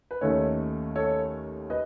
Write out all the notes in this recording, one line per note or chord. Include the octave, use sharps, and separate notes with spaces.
B4
D#2 D#3 A3 C#4 A4 C#5
A4 C#5
B4 D#5